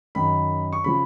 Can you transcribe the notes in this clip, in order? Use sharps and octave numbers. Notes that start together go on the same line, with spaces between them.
F#2 D#3 B5
C#6
C#3 F3 B5